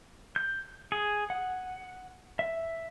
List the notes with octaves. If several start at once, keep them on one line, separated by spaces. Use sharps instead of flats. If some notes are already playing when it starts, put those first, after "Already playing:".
G6
G#4
F#5
E5